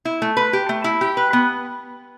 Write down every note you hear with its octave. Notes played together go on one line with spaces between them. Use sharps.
E4
A3
B4
G4
A3
E4
G4
B4
B3